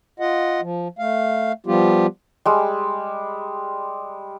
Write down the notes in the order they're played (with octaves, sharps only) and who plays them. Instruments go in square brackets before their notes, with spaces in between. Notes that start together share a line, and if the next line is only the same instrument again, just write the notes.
[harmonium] F4 D#5 F#5
F3
A3 F5
F3 G3 B3 F4 G4
[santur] G3 G#3